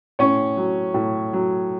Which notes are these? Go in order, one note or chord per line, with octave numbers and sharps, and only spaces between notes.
A2 C#4 C#5
F#3
A2
F#3